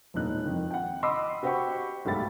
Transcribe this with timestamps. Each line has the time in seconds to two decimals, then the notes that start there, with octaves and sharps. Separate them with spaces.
0.14 E1 C2 A#2 D#4 F#6
0.43 F2 D#3 F3
0.71 F#5 G5
1.03 D#5 B5 C6 D6 E6
1.43 F#4 G4 C5 F#5 B5 C#6
2.05 B1 G#2 A3 G4 B5 A6